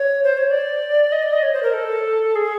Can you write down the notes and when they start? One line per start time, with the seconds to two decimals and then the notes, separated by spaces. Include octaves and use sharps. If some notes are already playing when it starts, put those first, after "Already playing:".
Already playing: C#5
0.24 C5
0.37 C#5
0.51 D5
1.12 D#5
1.22 D5
1.33 D#5
1.43 C#5
1.53 C5
1.63 A#4
1.74 A4
2.35 G#4